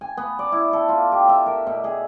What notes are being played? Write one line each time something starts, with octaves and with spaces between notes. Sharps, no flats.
G#5
B3
D5
E4
A4
F4
G4
E5
A#4
B2
G#4